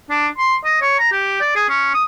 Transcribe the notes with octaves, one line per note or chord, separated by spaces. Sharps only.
D4
C6
D#5
C#5
A#5
G4
D5
G#4
C#4
D#6